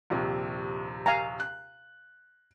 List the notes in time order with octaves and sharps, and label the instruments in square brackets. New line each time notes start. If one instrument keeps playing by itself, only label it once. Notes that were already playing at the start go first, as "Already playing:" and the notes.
[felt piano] A#1 D#2 C3
[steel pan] F5 G#5 A#5
[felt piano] F#6